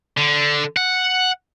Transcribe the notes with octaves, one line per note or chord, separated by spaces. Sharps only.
D3
F#5